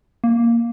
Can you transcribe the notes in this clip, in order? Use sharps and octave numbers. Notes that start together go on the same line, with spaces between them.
A#3